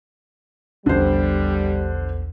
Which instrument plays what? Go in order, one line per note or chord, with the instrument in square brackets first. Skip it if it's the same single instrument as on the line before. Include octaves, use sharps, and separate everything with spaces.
[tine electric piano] A#1 E2 [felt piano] D3 C5 [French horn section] G3